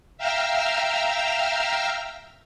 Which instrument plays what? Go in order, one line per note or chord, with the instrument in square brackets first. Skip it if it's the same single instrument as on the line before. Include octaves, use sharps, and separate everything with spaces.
[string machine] E5 F5 G5 A#5 E6 F6